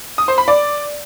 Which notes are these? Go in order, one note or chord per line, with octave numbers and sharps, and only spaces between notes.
D#6
C5
B5
D5